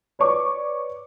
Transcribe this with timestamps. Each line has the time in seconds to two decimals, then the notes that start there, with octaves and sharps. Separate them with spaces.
0.19 B4 C#5 D5 C#6 D6